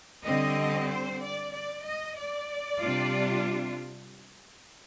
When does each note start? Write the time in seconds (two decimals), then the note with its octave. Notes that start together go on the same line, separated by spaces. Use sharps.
0.23 D3 G3 C4 D#5
0.88 C5
1.20 D5
1.52 D5
1.84 D#5
2.16 D5
2.80 C3 G3 D4 F4